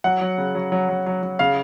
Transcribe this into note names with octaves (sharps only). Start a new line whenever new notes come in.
F#3 F#5
F#3
C#3
F#3
F#3
F#3
F#3
F#3
C#3 F5